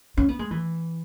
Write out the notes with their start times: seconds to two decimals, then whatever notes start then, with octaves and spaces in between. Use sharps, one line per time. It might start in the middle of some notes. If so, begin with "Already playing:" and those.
0.17 C#4
0.29 B3
0.39 G#3
0.51 E3